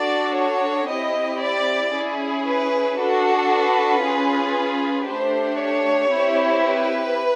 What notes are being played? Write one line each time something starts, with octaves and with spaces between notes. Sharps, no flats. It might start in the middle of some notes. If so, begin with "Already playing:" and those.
Already playing: D4 F#4 A4 D5
C#5
C4 E4 G4 D#5
D5
C#4 E4 G#4
B4
D4 F#4 A4
B4
C#4 F4 G#4
A3 D4 G4 C5
C#5
C4 E4 G4
B4